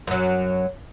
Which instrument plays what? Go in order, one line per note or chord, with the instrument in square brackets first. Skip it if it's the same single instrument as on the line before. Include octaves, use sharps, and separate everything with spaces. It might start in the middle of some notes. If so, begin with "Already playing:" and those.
[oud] F#2 F#3